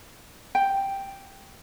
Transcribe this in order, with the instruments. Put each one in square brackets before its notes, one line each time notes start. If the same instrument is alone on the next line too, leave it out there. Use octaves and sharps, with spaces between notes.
[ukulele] G5